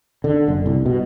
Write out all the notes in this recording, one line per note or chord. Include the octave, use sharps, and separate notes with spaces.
D3
F#1
C2
B2